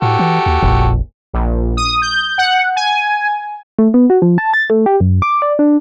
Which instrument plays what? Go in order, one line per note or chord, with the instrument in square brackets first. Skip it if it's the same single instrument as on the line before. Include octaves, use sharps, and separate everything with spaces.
[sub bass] A2 [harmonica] F#4 G4 A4
[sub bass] E3
D#2
[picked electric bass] F1 A#1 [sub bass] A#2
[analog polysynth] A#1
D#6
G6
F#5
G#5
[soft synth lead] A3
B3
F#4
F3
A5
A6
A3
G4
F#2
D6
D5
D4